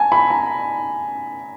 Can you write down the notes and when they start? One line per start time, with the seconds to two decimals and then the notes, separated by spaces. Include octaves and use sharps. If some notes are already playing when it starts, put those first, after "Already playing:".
Already playing: G#5 A5
0.12 B5
0.30 A#5